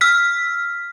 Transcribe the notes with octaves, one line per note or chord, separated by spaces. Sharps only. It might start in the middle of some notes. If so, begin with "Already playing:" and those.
E6 F6 B6